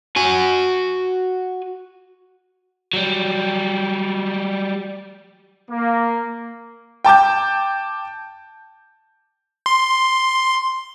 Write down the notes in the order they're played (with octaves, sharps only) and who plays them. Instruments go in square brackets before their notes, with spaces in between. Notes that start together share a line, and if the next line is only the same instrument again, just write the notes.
[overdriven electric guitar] F#4 G#5
F#3 G3
[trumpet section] A#3
[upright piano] G5 A5 D6 G6
[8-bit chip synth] C6